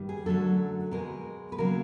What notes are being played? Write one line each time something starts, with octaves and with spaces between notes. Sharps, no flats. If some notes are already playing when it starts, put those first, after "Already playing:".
Already playing: G2 D#3 G3
G#4
F#2 D3 F#3 A3 A4
B2 G#3 A#4
B4
C#3 F#3 A#3 A#4